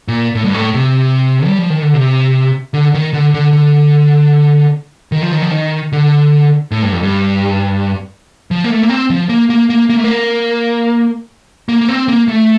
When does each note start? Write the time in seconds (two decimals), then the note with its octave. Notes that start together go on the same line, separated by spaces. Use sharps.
0.08 A#2
0.35 A2
0.45 G2
0.54 A2
0.75 C3
1.47 G3
1.59 F3
1.70 D#3
1.82 D3
1.94 C3
2.74 D3
2.94 D#3
3.13 D3
3.34 D3
3.53 D3
5.12 D#3
5.22 F3
5.32 D#3
5.42 F3
5.51 D#3
5.93 D3
6.71 A2
6.83 G2
6.93 F2
7.03 G2
8.51 F3
8.64 A#3
8.70 A3
8.83 A#3
8.90 C4
9.10 F3
9.29 A#3
9.50 A#3
9.70 A#3
9.90 A#3
9.97 A3
10.04 A#3
11.69 A#3
11.81 A#3
11.89 C4
12.08 A#3
12.28 A3